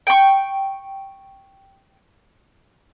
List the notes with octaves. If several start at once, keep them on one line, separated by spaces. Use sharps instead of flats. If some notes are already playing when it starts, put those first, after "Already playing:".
G5 C#6